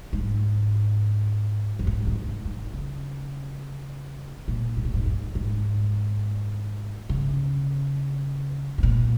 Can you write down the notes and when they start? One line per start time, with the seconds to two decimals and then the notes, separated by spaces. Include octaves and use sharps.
0.13 G#2
1.79 F2
1.87 G#2
2.07 C#3
2.15 D#3
2.45 D#3
2.73 C#3
4.48 A#2
4.77 G#2
4.85 A#2
4.94 G#2
5.06 F2
5.35 G#2
7.09 C#3
8.78 G#2
8.83 A#2